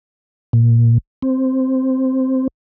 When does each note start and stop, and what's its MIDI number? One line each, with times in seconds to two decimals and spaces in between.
0.53 0.98 46
1.22 2.48 60